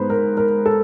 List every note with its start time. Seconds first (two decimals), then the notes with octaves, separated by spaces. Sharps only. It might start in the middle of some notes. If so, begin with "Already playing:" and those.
Already playing: G#2 G#3 B3 B4 C5
0.10 A#4
0.37 A#4
0.66 A4